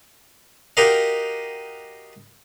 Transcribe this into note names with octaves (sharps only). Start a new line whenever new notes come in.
D#4 F#4 G4 A#4 D#5 F5